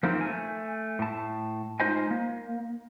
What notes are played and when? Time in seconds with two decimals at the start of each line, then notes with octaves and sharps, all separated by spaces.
0.03 F3 A3 A#3 C4 D#4 F4
0.21 A3 G#5
0.99 A2 A5
1.80 G#3 D#4 F4 C5 D#5 G#5
2.11 A#3